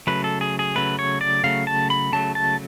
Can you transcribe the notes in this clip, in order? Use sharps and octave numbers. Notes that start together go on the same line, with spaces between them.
C#3 F#3 A3 B4
A4
G#4
G#4
C#3 F#3 A3 B4
C#5
D5
C#3 F#3 A3 F5
A5
B5
C#3 F#3 A3 A5
A5